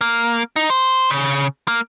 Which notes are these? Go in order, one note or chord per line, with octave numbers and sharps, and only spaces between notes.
A#3
D#4
C5
C#3
A#3